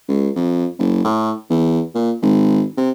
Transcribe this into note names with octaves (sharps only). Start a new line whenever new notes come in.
C#2
F2
F#1
A2
E2
A#2
G#1
C3